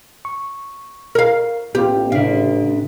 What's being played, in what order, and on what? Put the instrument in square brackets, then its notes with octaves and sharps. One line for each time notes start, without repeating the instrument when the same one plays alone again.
[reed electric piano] C#6
[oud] A#4 F5
[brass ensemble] A1 [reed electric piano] B3 F4 [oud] G4
[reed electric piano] A2 C#3 [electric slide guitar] D4 E5 [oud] F5